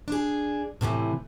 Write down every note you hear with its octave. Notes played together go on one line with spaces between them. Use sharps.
D4 G#4
A2 C3 D#3 E3